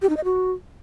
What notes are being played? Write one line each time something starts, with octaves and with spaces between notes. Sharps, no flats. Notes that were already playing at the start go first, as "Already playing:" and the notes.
G4
D#4
D#5
F#4